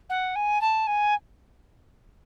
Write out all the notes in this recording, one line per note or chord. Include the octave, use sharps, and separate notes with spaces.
F#5
G#5
A5
G#5